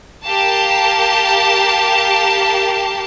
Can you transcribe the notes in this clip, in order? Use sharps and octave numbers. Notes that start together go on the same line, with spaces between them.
G4 A#4 F5 A5